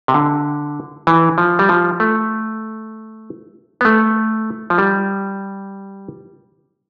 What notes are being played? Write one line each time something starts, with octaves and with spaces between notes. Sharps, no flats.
C3
D3
E3
F3
G3
F3
A3
B3
A3
F3
G3